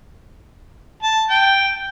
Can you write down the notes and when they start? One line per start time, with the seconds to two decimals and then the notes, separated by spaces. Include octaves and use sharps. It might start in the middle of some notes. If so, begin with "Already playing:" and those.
1.03 A5
1.30 G5